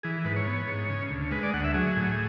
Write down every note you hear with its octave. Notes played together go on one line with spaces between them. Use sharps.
E3 G#4
G#2 B4
C#5
B3
G#2
C#3
D2
G#3 B4
D5
D2 F#5
E5
F#3 G#4
A2